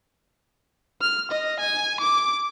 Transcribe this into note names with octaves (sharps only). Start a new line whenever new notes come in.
F6
D#5
G#5
D6